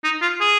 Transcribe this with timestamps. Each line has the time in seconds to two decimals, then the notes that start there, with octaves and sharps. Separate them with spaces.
0.04 D#4
0.22 F4
0.41 G#4